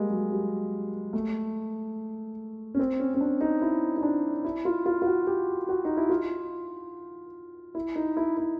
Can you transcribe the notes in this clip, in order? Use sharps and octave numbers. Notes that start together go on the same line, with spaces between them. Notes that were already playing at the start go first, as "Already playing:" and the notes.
Already playing: G3 G#3 A#3
F#3
G3
A3
C#4
C4
C#4
C#4
D4
D#4
E4
D#4
D4
E4
F4
F4
F4
F#4
G4
F#4
D#4
E4
F4
E4
D#4
E4
E4